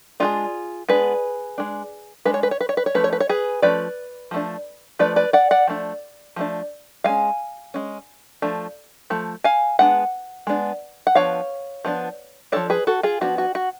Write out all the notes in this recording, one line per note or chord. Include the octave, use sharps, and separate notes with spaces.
G#3 B3 D4 F4 G#4
G#3 B3 D4 G#4 B4
G#3 D4
G#3 D4 B4
C#5
B4
C#5
B4
C#5
B4
C#5
F3 A3 C#4 B4
C#5
B4
C#5
G#4 B4
F3 A3 C#4 B4 D5
F3 A3 D4
F3 A3 D4 B4 D5
B4 D5
D5 F#5
D5 F#5
F3 A3 D4
F3 A3 D4
G#3 C#4 F5 G#5
G#3 C#4
F3 A3 D4
F3 A3
F5 G#5
G#3 B3 D4 F#5
G#3 B3 D4
F#5
F3 B3 D4 C#5 F5
F3 B3 D4
F3 B3 D4 A4 C#5
G#4 B4
F#4 A4
F4 G#4
F3 B3 D4 F#4
F#4
F#4